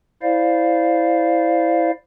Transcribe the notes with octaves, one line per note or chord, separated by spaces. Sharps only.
E4 C5 D5 F5